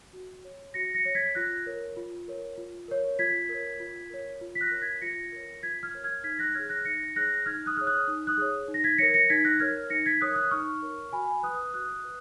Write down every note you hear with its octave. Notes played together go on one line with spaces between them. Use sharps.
F#4
C#5
F#4 A#6 C#7
A#6 C#7
C#5
G#6 B6
F4 F#6 A#6
A#4 C#5
F4
A#4 C#5
F4
A#4 C#5
F4 G#6 B6
A#4 C#5
F4
A#4 C#5
F4
B6
F#6 A#6
A#4 C#5
G#6 B6
F4 A#6 C#7
A#4 C#5
F4 G#6 B6
F6 G#6
A#4 C#5
F6 G#6
D#4 G#6 B6
F#6 A#6
G#4 C#5 F6 G#6
F#6 A#6
D#4 A#6 C#7
G#4 C#5 F#6 A#6
D#4 F6 G#6
D#6 F#6
G#4 C#5 F6
D#6 F#6
D#4
D#6 F#6
G#4 C#5
D#4
A#6
G#6 B6
A#4 C#5 A#6 C#7
A#6 C#7
D#4 G#6 B6
F#6 A#6
A#4 C#5 F6 G#6
D#4 A#6 C#7
G#6 B6
A#4 C#5 D#6 F#6
D#6 F#6
D#4 C#6 F6
A#4 C#5
F#4 G#5 B5
B4 D#6 F#6
F#4 D#6 F#6
B4